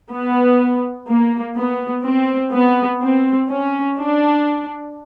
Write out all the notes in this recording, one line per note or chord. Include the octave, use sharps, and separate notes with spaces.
B3
A#3
B3
C4
B3
C4
C#4
D4